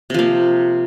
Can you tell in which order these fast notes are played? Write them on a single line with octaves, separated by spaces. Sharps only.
C3 F3 A#3